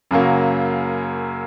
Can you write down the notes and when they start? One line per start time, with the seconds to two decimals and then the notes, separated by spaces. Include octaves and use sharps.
0.11 F#2 C#3 F#3 A#3